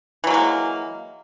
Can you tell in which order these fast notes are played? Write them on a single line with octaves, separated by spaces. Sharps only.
E3 F#3 A#3 G#3